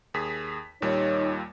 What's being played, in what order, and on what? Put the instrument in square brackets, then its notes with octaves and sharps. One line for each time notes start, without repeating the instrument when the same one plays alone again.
[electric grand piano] D#2 G#4 B6
[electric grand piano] D#2 A#2 G3 [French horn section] D#4 C#5